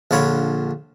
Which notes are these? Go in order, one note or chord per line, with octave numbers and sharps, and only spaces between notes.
A#1 D3 F4 C#5 B5